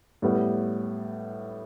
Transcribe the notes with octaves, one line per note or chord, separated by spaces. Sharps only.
A2 G3 B3